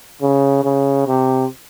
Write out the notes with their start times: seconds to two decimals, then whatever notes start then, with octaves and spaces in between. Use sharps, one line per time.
0.21 C#3
0.64 C#3
1.07 C3